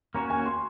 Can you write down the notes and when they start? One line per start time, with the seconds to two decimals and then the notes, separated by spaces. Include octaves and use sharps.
0.15 A#3 C#4 F#4 C#5 A#5
0.30 G#5
0.46 C6